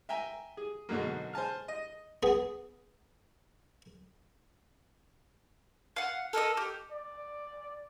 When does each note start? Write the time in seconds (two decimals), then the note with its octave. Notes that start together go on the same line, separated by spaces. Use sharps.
0.09 E5 G5 G#5 A#5
0.57 G#4
0.89 G#2 B2 D3 F#3 A#3
1.33 C5 G#5 A5 F6
1.68 D#5
2.23 B3 G#4
5.96 F5 F#5
6.33 A4 A#4 D#5 D#6
6.57 G4
6.91 D5